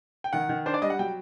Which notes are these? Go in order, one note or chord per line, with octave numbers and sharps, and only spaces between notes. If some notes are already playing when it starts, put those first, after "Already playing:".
G5
D#3 F#5
D#3
D4 C5
D5
G3 D#5
F#5
F#3 G5